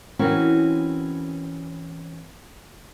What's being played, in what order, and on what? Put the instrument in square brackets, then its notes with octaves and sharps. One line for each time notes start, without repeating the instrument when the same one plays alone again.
[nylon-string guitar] E3 C4 C#4 F#4 A#4 B4